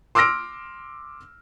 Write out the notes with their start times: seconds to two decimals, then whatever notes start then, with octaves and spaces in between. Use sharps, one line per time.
0.15 C6 D6 E6 F6 A#6 D7